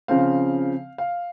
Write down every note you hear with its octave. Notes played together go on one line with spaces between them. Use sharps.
C#3 F3 C4 F5
F5